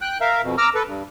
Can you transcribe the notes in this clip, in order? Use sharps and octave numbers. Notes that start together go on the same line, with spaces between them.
G5 F#6
A#4 E5 F5
F2 B2
A#5 D6 E6 F6
A4 B4
G2